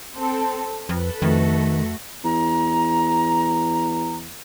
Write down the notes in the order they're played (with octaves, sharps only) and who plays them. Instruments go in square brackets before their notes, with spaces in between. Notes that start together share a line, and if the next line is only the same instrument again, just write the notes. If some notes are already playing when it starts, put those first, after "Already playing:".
[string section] C4 A4
[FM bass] F2 [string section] A4 B4
[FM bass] F2 [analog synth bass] D#3 [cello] A3 F#4
[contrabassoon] E2 [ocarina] A#5